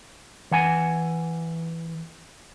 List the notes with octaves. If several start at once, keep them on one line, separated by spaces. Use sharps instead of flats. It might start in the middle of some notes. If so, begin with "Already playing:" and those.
E3 F#5 G#5